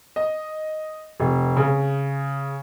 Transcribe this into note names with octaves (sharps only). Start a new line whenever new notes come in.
D#5
F1
C#3